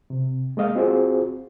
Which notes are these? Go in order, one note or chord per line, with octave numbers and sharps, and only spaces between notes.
C3
G#3 A#3 D#5 F5
C4 F4 F#4 G#4 C5